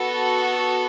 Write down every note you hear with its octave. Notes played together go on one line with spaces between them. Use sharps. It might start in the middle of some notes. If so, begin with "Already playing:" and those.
Already playing: B3 F#4 A4